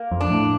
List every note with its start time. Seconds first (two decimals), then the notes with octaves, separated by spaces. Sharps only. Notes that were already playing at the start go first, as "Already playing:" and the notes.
Already playing: A#3
0.11 F2
0.21 D4
0.30 A2